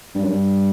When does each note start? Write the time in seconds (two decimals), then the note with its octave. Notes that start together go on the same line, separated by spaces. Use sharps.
0.15 G2
0.23 F#2
0.30 G2